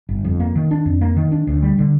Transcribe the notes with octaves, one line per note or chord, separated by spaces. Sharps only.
G1
F2
A#3
D#3
D4
F2
A#3
D#3
D4
D2
G3
D3